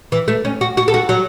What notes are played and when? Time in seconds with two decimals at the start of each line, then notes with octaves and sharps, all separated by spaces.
0.12 E3
0.28 A3
0.45 C#4
0.61 F#4
0.77 F#4
0.88 A4
0.94 F#4
1.09 F#3